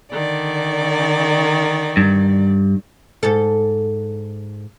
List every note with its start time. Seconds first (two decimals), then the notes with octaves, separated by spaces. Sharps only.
0.11 D3 D#3 D5
1.97 G2
3.23 G#2 A4